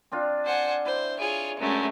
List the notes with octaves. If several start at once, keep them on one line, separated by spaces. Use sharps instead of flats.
C4 D4 F4
C5 F#5 G#5
E4 C5
F4 G#4 C#5
F#2 G#3 A3